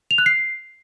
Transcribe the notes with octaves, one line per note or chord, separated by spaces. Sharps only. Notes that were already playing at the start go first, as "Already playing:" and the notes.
F7
F#6
C7